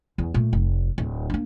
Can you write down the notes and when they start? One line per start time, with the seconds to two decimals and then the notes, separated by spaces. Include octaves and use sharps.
0.18 E2
0.34 A#2 A3
0.53 F1
0.98 D1
1.30 A#3 D4